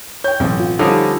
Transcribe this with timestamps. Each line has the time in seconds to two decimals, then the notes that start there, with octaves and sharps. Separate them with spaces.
0.24 C#5 G5 G6
0.40 A1 F#2 B2 C4
0.60 F4
0.79 D3 F3 G3 C#4 D#4